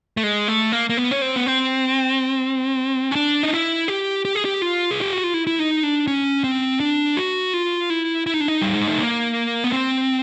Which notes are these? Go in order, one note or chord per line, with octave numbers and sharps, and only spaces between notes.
A3
G#3
A3
A#3
A#3
B3
C#4
C4
B3
C4
C#4
D4
D#4
E4
G4
G4
G#4
G4
F4
G#4
G4
F#4
F4
E4
E4
D#4
D4
C#4
C4
D4
F#4
F4
E4
E4
D#4
D4
D#4
G3
G#3
A3
A#3
B3
C4